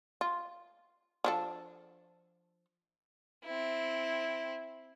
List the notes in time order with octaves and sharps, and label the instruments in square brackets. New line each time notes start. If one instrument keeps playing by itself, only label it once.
[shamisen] F4
F3 D4 A4
[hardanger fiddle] C4 E4